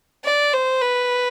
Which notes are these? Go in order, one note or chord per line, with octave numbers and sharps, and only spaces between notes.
D5
C5
B4